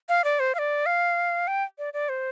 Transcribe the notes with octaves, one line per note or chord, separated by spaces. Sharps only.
F5
D5
C5
F5
D5
F5
G5
D5
D5
C5